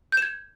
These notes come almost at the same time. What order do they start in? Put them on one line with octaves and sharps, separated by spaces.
G6 E7 G#6